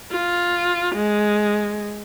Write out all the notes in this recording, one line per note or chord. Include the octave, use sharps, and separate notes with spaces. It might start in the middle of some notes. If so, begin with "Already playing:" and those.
F4
G#3